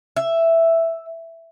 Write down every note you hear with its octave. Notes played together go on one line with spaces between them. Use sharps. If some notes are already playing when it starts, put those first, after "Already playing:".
E5